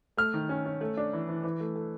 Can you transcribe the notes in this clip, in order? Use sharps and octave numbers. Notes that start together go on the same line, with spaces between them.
A3 F6
D#3
C#4
C#4
A3
D4
E3
E3
E3
A3
A3